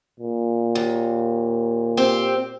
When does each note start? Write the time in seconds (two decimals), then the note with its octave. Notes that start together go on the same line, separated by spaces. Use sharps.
0.20 A#2
0.75 D#2
1.97 C4 G4 C5